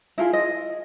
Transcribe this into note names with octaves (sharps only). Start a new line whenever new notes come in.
E4 F4 G#4
D#5